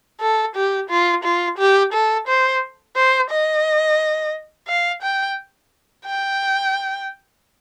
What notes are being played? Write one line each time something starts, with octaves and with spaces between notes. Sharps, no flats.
A4
G4
F4
F4
G4
A4
C5
C5
D#5
F5
G5
G5